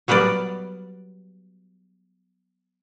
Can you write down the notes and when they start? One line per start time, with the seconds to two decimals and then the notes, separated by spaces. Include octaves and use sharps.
0.08 F#3 G3 B3 A#4 D5